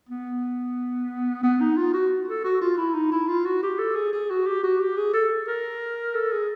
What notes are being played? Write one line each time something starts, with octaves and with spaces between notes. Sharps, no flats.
B3
B3
D#4
F4
F#4
A4
F#4
F4
E4
D#4
E4
F4
F#4
G4
A4
G#4
G#4
F#4
G4
F#4
G4
G#4
A4
A#4
A4
G#4